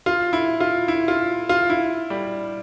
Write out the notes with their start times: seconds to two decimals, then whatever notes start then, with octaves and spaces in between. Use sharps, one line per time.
0.06 F4
0.33 E4
0.60 F4
0.88 E4
1.08 F4
1.49 F4
1.70 E4
2.10 G3